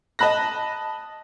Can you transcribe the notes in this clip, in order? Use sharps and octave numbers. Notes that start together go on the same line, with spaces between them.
D#5 A5 B5 F#6 A#6